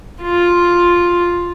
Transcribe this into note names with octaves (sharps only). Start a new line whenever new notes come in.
F4